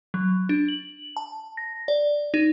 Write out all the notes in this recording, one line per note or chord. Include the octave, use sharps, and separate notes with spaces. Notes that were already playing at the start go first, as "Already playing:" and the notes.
F#3
D4
F#7
A5
A#6
D5
D#4